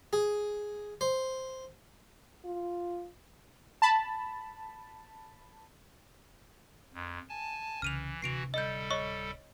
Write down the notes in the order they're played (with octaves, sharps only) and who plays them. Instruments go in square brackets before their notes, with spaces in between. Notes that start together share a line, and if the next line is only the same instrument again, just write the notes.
[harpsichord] G#4
C5
[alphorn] F4
[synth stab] A5 B5
[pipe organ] F2
G#5 A5
[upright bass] C2 C#3 [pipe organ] E3 [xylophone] F6 D#7 F7
[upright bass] D1 C3 [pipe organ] E3 F#4 [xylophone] C7 D7 F7
[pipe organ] G3 A4 [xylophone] D#5 G6
[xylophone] C#5 D#5 C#6